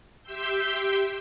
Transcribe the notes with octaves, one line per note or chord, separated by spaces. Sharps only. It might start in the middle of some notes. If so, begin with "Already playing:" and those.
G4 E5 G5 C6 E6 G6